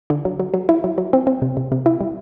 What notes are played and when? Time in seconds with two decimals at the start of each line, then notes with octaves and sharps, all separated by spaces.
0.10 D3
0.25 F#3
0.40 F#3
0.54 F#3
0.69 E4
0.84 F#3
0.98 F#3
1.13 C4
1.27 C4
1.42 C3
1.57 C3
1.72 C3
1.86 E4
2.01 G3